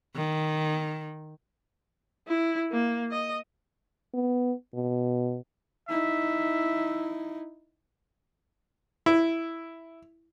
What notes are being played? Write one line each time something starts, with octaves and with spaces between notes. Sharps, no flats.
D#3
E4
A#3
D#5
B3
B2
D#4 E4 E5
E4